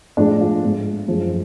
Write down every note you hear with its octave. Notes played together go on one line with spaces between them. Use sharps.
A2 F3 G#3 D4
F4
G#2 G#3
F#2 F3 G#3